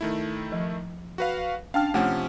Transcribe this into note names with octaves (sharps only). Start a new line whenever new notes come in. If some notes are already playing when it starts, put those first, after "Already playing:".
D#3 A3 E4
F3
F#4 B4 F5
C#4 D4 F5 G5 A5 F6
C3 F3 A3 C#4 F#5